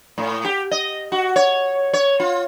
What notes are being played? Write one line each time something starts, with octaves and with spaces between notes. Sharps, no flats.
A2
G4
D#5
F#4
C#5
C#5
F4